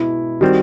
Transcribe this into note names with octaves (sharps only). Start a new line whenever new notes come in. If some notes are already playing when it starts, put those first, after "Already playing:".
Already playing: B2 G#3 E4
D#3 G3 C4 F#4